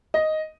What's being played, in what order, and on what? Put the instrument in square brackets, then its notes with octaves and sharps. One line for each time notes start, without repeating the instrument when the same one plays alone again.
[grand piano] D#5